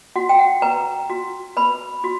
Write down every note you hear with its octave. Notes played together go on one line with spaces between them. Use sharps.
F#4 F#5
G5
F#5
B4 A#5
F#4
B4 B5
F#4